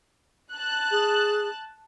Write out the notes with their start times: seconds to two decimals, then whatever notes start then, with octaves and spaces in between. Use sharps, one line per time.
0.54 A5 F#6
0.91 G#4